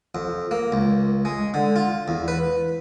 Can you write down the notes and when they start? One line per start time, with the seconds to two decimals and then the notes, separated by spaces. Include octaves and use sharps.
0.15 F2
0.51 A#3
0.72 C#2
1.25 G#3
1.54 D3
1.76 F4
2.08 E2
2.28 B4